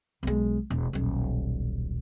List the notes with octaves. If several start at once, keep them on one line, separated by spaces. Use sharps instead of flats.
B1 G#3
E1
D#1 B1